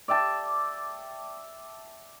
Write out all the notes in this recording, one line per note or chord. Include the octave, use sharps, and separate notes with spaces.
D5 E5 G5 A5